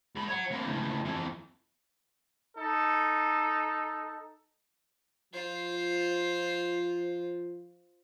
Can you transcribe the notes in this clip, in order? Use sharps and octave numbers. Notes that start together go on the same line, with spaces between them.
G#2 B5
C#5 F#5
A#3 C4
C#2 A2
F2 E3
D#4 A4
F3 F4 C5